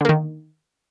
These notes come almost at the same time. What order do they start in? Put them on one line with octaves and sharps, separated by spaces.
D3 A#3 D#3